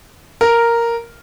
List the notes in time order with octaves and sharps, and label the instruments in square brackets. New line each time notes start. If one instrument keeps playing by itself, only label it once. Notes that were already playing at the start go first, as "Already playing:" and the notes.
[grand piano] A#4